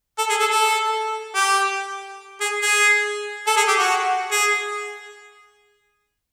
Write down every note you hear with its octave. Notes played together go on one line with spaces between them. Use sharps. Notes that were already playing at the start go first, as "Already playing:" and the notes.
A4
G#4
A4
A4
G4
G#4
G#4
A4
G#4
G4
F#4
G#4